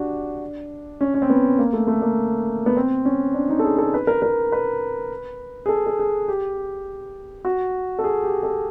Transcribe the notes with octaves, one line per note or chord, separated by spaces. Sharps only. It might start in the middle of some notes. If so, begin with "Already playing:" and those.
Already playing: D4 F#4 G4
C#4
C#4
C4
B3
A#3
A3
A3
A#3
B3
C4
C#4
D4
D#4
A4
G#4
A4
B4
A#4
A#4
B4
G#4
A4
A4
G#4
G4
F#4
A4
G#4
G4
A4